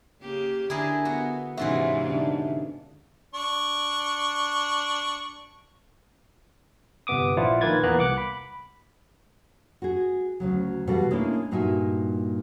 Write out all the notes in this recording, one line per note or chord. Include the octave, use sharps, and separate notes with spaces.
C#3 A#3 G4
D3 D4 E4 G#4 A#4
B3 F#4
E2 G#2 C3 E3 C#4 F4 F#4 E5
D3 D4 D#4
D4 C#6
G1 C3 B3 D6 D#6
A#1 F3 E4 F4 D5 F#5
A#2 D#3 A#3 B4 G#6 A6
E2 E3 A#3 B3 A#5 F#6
C2 F#5 D6 F#6
B5
F#4 G#4
D2 C#3 F#3
B2 E3 G3 F#4 A4 F5
G#3 A#3 C#4 D4 E4
G2 A#2 D#4 F#4 E5 G#5